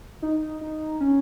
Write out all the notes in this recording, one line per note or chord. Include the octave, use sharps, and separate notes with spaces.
D#4
D#4
C#4